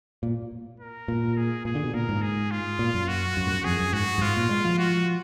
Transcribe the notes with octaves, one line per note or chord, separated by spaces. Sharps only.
A#2
A#4
A#2
G#4
A#2 G#4
D3
B2
A#2 A#4
G#2
G#4
F4
A#2
F#2
F#4
F#2
G#2
F#2
F2 G#4
F#2
G#2 F#4
F#2
G#2 F4
A#2
G#3
F3
F#4